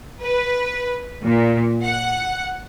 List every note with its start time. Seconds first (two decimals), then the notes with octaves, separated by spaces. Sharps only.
0.22 B4
1.23 A#2
1.82 F#5